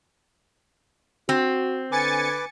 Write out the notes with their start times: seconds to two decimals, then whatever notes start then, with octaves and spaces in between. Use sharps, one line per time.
1.29 C4 F#4
1.92 D3 B4 G#5 D6 A6 C#7